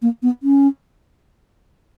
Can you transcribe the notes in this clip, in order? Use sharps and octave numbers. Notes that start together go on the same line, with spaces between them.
A#3
B3
C#4